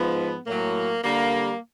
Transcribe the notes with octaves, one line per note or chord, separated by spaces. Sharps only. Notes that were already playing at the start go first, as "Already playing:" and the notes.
Already playing: G#2 F3 B3
A2 F#3 A#3
G2 D3 G3 A#3